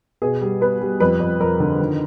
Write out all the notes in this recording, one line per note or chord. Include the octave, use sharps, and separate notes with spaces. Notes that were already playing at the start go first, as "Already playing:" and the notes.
B2 G#4
G3
B3 B4
G3
F2 B4
F2
F2 A#4
D3
D#3